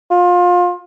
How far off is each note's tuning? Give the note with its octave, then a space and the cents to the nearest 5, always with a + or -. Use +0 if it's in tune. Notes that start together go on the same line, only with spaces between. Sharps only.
F4 +25